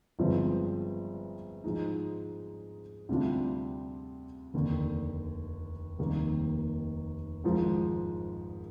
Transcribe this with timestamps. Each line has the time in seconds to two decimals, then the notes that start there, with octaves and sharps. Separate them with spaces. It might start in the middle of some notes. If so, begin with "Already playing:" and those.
0.19 G1 G2 F3 G#3 C4
1.64 G#2 F3 G#3 D#4
3.09 D2 C3 G3 D4 F4
4.54 F1 D#2 D3
5.99 F1 D#2 D#3 G3 A#3
7.44 G#1 G#2 F3